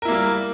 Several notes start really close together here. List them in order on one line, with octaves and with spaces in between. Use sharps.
A#4 E4 A#3 G3